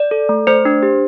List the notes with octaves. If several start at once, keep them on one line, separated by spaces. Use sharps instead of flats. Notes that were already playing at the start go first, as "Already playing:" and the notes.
Already playing: D5
A4
A3
A3 C5
D4
G4